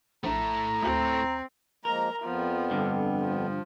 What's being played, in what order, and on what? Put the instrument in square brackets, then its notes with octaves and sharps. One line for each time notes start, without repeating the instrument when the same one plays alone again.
[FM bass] A#1 [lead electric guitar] A3 E4 [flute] A#5
[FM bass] D2 [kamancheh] C4
[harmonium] F3 G#3 A#3 [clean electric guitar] A#4 [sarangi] A#5
[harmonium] F2 B3 [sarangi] F3
[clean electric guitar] G2 D3
[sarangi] F3